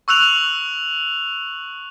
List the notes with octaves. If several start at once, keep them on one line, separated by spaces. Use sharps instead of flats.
C#6 E6 F#6 F7 F#7